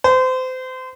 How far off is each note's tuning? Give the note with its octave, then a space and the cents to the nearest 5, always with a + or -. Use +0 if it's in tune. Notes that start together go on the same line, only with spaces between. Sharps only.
C5 -30